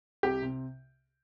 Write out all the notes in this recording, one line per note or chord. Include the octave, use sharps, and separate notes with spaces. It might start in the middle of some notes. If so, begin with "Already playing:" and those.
C2 G4
C3